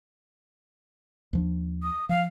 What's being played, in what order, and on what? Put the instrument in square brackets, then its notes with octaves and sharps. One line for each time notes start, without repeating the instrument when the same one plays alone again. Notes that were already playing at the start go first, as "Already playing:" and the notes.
[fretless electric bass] D#2 F3 D4
[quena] D#6
[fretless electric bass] F3 [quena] F5